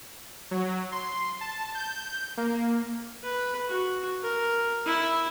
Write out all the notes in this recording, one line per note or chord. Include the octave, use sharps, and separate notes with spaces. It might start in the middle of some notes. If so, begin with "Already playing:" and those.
F#3
C6
A5
G6
A#3
B4
F#4
A#4
E4